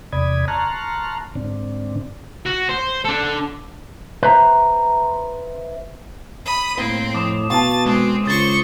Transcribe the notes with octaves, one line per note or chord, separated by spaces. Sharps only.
E2 C3 D5 B5 D#6 G#6
A5 A#5 C6 C#6 F6 F#6
G#2 D3 C4 D4
F#4
C5
D4 A4
B4 C5 E5 A#5
B5 D#6
A2 A#3 C4
F2 D6 D#6 E7
B2 F5 F#5 A5 C#6 A6
D3 G#3 C4
C#2 C5 C#6 D#6 A6 G7